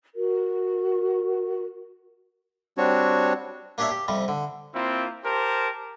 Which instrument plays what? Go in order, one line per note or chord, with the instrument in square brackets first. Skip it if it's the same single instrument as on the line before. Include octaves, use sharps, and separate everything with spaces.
[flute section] F#4 A#4
[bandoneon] G3 C4 D4 F#4 C#5
[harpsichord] A#3 D4 G4 C#5 D5 E5
G4
F2 C3 G3
D3
[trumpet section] A#3 C4 E4 F4
G4 A#4 C5 A5